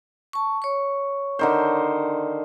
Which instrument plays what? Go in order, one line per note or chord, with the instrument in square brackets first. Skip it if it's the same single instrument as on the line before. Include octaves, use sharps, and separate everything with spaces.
[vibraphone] A5 C#6
C#5 C#6
[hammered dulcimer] D3 D#3 C5